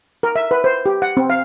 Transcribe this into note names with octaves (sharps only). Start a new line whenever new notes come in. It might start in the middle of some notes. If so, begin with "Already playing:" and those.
A#4
E5
B4
C5
G4
F#5
C4
F5